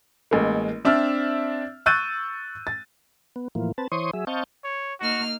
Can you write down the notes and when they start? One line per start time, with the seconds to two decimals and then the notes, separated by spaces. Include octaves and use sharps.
0.31 A1 G#3 A#3
0.85 C4 D4 E5 E6 F6
1.86 C#6 E6 F#6 G6 A6 D#7
2.67 A6
3.36 B3
3.55 A2 E3 F3 A#3
3.78 C4 B4 A5
3.92 E3 C5 C#5 C6 C#6 D#6
4.13 F#3 G#4 E5
4.27 C4 D#5 F5 A5 C#6 G6
4.64 C#5
5.00 A#3 D#4 F#4 F6